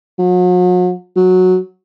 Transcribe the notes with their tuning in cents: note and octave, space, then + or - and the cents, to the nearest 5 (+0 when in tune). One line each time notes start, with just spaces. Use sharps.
F#3 -40
F#3 -10